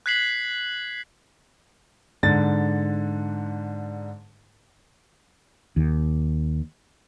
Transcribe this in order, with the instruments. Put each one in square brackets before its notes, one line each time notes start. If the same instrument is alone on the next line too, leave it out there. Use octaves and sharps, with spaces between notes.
[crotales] F#6 G#6 B6 C7 F#7
[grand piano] G#2 D3 A6
[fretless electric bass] D#2